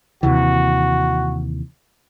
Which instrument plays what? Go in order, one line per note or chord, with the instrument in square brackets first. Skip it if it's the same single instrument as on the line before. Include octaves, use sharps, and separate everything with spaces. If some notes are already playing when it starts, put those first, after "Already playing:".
[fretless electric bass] D#2 C3 E3 [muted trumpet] F#4